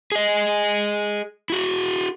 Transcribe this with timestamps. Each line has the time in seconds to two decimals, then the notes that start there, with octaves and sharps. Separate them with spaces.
0.12 G#4 D#5
1.50 E4 F#4